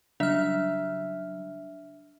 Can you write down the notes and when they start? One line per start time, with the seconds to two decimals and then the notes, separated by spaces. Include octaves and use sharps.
0.20 C#3 F#3 G3 D4 E5 F6